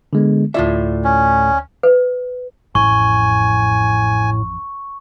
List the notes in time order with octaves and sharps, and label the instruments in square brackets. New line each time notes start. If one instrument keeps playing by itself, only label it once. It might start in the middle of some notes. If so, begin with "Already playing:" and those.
[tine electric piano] D3 G#3 B3
[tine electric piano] D2 D5 [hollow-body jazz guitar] A2 F4 E5
[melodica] C#4
[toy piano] B4
[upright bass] A1 F2 [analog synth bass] A2 [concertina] G#5 [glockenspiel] C#6